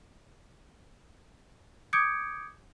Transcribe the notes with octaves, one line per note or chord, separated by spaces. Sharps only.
D6 D#6 G6 G#6 C#7 D7